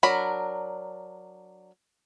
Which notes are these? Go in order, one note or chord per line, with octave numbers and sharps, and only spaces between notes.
F#3 D4 A#4 B5